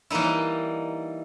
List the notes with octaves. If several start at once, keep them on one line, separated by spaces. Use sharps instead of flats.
E3 G3 A#3 D#4 E4